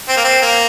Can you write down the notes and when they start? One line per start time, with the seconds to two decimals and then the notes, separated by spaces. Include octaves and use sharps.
0.09 C4
0.17 A#3
0.24 C4
0.42 A#3